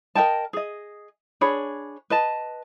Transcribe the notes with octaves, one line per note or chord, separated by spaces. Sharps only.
A#4 D#5 G5 A5
G#4 D#5
D4 G#4 C#5 B5
B4 D#5 A5